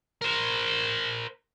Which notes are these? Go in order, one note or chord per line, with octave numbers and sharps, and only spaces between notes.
A#4 C5